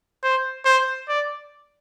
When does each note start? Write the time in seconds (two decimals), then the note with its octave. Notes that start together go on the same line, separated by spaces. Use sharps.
0.23 C5
0.65 C5
1.08 D5